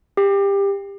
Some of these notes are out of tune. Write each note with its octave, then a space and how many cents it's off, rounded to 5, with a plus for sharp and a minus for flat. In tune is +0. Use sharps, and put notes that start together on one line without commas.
G4 +20